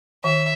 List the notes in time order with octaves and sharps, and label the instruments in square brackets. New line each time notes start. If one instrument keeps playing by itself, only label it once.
[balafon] D#3 [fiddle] E5